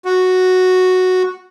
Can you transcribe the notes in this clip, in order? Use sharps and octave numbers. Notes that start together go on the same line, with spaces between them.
F#4